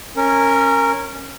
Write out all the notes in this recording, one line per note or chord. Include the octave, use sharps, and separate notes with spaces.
C#4 A#4